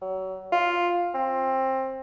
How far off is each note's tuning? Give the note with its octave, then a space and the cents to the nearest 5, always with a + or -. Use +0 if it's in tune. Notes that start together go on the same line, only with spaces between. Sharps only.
F#3 +30
F4 +5
C4 +20